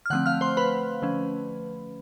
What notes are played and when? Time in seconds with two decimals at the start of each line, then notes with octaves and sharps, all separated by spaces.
0.06 F6
0.10 D3 F3 A3 C4 F#5 F#6
0.26 F5 F6
0.41 C5 C6
0.57 B4 B5
1.02 D3 F3 A3 C#4